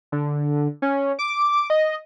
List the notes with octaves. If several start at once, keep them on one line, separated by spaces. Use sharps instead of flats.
D3
C#4
D6
D#5